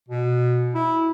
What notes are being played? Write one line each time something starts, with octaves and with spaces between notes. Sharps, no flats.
B2
E4